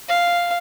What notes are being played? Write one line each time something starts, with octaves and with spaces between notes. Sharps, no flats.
F5